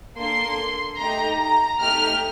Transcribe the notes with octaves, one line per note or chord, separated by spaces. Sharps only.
A#3 D4 A4 C6
A3 D#4 G4 A#5
A#5
A3 D#4 G4 F6